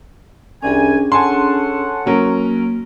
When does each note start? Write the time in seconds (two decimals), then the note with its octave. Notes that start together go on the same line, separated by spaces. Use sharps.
0.62 C2 C#4 D4 G#4 G#5
1.12 A4 C#5 F#5 G#5 A5 C6
2.06 F#3 A#3 C#4 A#4